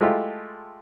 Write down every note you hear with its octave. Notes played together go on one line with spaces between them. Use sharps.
G#3 A3 E4 F4 G4 A4